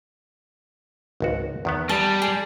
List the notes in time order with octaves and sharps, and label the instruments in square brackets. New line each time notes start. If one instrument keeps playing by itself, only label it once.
[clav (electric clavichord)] G#1 C#2 F#4
E2 D#3 B3
[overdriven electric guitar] G3 [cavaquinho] A5
[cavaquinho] G#4